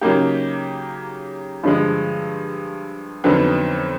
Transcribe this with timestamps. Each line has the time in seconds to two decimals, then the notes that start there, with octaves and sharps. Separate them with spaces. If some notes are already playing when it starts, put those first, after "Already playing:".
0.01 C#3 F#3 A#3 D#4 G4
1.63 G2 D3 F3 G#3
3.24 F2 D3 F#3 B3 D#4